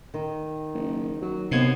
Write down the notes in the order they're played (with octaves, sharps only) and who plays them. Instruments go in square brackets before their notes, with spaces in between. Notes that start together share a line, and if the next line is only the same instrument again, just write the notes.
[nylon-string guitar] D#3
[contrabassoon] F#1
F#3
[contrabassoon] D#2 [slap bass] C3 [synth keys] B3 G#6 C7